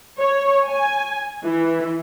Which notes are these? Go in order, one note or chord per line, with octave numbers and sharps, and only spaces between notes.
C#5
G#5
E3